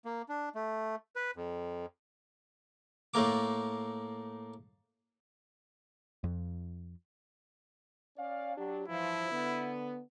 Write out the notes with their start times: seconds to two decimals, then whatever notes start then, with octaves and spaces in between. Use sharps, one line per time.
0.05 A#3
0.29 D4
0.55 A3
1.16 B4
1.36 F2
3.14 A2 A3 A#3 D6
6.24 F2
8.18 C#4 D5 F5
8.57 F#3 D4 G4
8.88 G2 E3 F3 E4
9.31 D3 B3